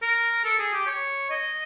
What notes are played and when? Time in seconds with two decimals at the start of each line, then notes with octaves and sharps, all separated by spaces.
0.02 A#4
0.44 A4
0.59 G#4
0.73 G4
0.87 C#5
1.30 D#5